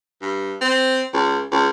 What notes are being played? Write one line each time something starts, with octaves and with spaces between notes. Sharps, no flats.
G2
C4
C#2
C#2